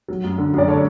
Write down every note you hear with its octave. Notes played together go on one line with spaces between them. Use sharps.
F#3
F#2
D3
F#2 D5
D3 A4 C#5